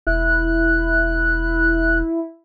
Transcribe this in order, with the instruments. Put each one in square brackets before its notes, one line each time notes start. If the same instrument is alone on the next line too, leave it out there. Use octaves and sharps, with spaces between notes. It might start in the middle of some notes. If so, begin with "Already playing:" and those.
[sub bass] E1 [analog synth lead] E4 [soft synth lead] F#6